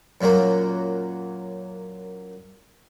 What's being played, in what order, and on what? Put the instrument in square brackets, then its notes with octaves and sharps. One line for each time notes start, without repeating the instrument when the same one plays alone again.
[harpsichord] F#2 A#2 F#3 A#3